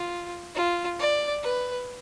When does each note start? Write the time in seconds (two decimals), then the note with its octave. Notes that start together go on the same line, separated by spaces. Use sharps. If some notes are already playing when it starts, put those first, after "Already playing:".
Already playing: F4
0.55 F4
0.99 D5
1.43 B4